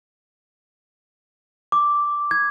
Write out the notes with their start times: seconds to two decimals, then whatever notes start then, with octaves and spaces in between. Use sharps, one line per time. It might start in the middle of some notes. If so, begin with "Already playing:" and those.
1.72 D6
2.31 G#6